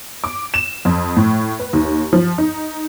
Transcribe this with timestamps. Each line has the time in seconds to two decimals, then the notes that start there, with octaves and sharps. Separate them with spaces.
0.24 D6
0.54 E7
0.85 F2
1.17 A2
1.59 B4
1.73 D#2
2.13 F3
2.38 D#4